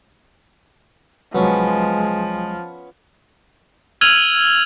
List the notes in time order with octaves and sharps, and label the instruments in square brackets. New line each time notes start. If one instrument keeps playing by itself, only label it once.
[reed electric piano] C2 F#3 [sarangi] F3 [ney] G#3 [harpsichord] B3 C#4
[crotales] E6 F6 G#6 D#7 F7 F#7